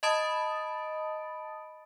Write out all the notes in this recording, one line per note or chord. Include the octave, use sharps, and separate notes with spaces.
D#5 A5 B5 D#6 A6 D7